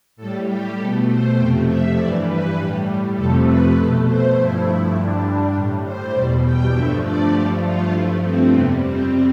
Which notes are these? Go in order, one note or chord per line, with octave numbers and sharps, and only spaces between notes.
A2 G3 A4
G4
B2 A3 A4
C5
F2 C3 F3 A3 G5
E5
G2 E3 G3 D5
B4
A2 G3
F2 C3 F3 A3 A4
B4
B2 A3 A4
C5
G2 F3 A3 E4
G2 D3 G3 D4
A2 G3
C5
E2 B2 G3 D5
G5
G2 D3 F3 A3 E5
D5
G2 F3 A3 G4
F4
G2 F3 A3 E4
C4
F2 C3 G3 B3
C4